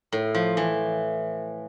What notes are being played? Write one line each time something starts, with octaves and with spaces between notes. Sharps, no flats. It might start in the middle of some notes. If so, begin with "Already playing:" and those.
A2
F3
E3